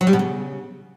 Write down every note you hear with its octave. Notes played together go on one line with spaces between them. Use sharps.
F#3
G3
B2
C#3